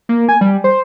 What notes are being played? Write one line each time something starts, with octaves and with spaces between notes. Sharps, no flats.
A#3
G#5
G3
C5